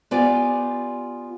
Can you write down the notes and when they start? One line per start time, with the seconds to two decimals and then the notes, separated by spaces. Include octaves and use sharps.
0.11 B3 F4 G4 D5 G#5